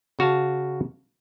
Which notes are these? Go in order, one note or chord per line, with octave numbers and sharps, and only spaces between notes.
C#3 F#4 F5 A5